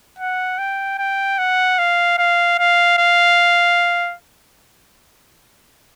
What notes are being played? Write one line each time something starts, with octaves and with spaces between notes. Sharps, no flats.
F#5
G5
G5
F#5
F5
F5
F5
F5